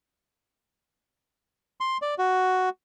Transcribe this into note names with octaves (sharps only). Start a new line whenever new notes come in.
C6
D5
F#4